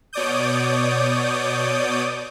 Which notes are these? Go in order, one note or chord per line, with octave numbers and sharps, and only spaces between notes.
B2 C#5 D5 D6 D#6 G6